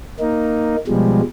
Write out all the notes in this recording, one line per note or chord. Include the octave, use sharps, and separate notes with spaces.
A#3 D#4
B2 F3 G3 G#3